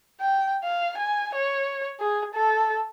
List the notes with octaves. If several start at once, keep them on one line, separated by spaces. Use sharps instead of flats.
G5
F5
G#5
C#5
G#4
A4